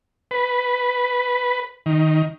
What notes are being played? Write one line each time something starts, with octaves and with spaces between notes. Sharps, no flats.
B4
D#3